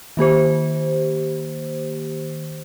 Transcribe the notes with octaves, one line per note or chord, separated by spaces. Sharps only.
D#3 A#3 G4 C5